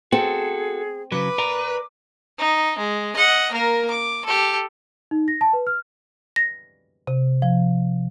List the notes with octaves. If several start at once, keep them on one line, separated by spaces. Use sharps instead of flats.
C4 F#4 G#4 A4
C#3 F#3 B4 D6
A#4 D5 A#5
D#4
G#3
D#5 F#5
A#3 A#4
D6
G4 A4
D#4
A#6
A5
B4
F6
A#6
C3
F3